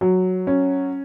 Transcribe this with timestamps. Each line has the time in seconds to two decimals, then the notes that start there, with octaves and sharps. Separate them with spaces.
0.01 F#3
0.47 C#4